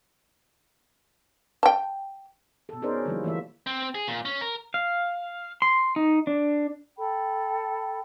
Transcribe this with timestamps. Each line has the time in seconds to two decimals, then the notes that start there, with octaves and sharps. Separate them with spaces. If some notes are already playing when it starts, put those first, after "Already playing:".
1.63 G5 A5
2.69 B2 A4
2.82 C#4 D#4 G#4 A#4 C5 D5
3.05 D3 F3 G3 A#3 E4
3.24 E3 A3 A#3 C5 E5
3.67 C4
3.95 G#4
4.08 A#2
4.25 C#4
4.41 A#4
4.74 F5
5.62 C6
5.96 D#4
6.27 D4
6.98 A4 G5 B5